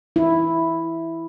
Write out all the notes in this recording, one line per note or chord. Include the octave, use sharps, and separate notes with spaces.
E4